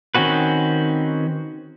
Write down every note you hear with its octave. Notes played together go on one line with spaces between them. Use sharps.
D#3 C4 C#4 F#4 B4